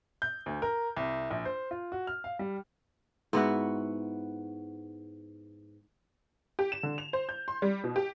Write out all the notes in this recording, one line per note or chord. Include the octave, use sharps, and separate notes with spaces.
G6
D2
A#4
C2
A#1
C5
F4
F#4
F6
F5
G3
G#2 B3 E4 F#4
G4
E7
D3
F7
C5
G6
C6
G3
B2
G4